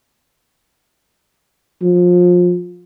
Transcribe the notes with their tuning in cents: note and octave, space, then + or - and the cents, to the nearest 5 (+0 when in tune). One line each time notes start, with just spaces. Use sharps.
F3 +25